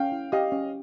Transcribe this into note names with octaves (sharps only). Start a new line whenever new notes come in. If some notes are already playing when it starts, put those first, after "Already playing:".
Already playing: C#4 F5 G5
E4
G4 D#5 F5
C#4